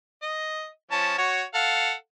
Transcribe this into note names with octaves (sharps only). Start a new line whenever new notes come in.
D#5
F3 C#4 A5
F#4 C#5
A4 F5 F#5